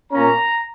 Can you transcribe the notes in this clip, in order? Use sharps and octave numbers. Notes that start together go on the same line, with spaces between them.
A#2 A#3 C#4 A#5